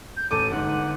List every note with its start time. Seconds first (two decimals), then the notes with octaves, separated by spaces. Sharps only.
0.17 G6
0.31 A1 A4 D6 D#7
0.51 G1 G#2 F#5